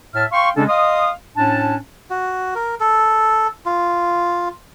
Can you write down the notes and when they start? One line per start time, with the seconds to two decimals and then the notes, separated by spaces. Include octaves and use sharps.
0.15 A2 E5 A5 F6
0.32 F5 G5 C6 C#6
0.56 C#3 G#3 C#4 D4 A4
0.69 D#5 F5 C6 D#6
1.37 A2 C#4 D4 A5
2.10 F#4
2.55 A#4
2.80 A4
3.66 F4